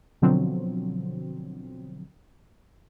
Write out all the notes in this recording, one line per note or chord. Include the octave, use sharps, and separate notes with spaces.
B2 D3 F3 F#3 C4